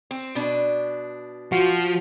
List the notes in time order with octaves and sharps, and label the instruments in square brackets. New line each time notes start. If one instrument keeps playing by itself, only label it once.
[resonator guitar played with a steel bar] C4
B2 D4
[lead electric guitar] F3 [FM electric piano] F#4